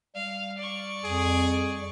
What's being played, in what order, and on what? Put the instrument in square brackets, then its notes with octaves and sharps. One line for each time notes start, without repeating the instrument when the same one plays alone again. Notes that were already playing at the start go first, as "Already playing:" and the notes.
[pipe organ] G3 [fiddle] F5
[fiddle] D5 C#6
[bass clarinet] F2 [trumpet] G#4